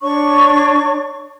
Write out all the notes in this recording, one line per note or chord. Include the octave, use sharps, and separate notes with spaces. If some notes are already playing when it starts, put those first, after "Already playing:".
D4 C#5 C#6